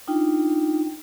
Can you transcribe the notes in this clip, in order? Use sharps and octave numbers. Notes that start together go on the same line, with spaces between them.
D4 D#4 F4 G5